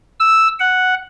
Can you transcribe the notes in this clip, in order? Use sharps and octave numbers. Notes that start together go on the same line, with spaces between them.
E6
F#5